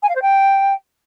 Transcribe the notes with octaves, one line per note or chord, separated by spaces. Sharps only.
G#5
F5
C5
G5